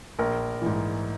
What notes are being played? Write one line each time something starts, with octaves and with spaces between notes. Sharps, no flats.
A#1 A#4
G#2 E3